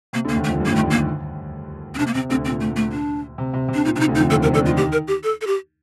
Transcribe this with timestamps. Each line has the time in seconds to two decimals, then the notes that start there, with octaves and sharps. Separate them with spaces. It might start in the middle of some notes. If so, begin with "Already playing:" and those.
0.13 C3 A#3
0.25 D2 D3
0.29 A#3
0.36 D#2 D#3
0.44 A3
0.48 F2 F3
0.60 G2 G3
0.66 D3 A#3
0.72 D#2 D#3
0.76 A3
0.83 D2 D3
0.90 A#3
1.95 C4
1.98 C3 D4
2.07 A#3
2.14 C3 C4
2.29 D2 D3 C4
2.45 A#2 C4
2.61 A3
2.76 A3
2.92 D4
3.38 C3
3.54 C3
3.68 C3
3.74 D4
3.85 A#2 D#4
3.96 C3 D4
4.00 D#4
4.07 D2 D3
4.15 D#4
4.19 F2 F3
4.31 D#2 D#3 A4
4.42 C3 C4 A#4
4.53 D3 D4 A4
4.65 D#3 D#4 F4
4.77 G4
4.92 A#4
5.08 G4
5.24 A4
5.41 A4
5.47 G4